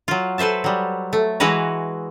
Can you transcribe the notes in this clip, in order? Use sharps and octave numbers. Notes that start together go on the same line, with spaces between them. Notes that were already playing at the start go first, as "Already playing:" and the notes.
F#3 F4
A4 B4 C5 E5 A5
F#3 G3
A3
E3 G#3 E4 F#4 B4 A#5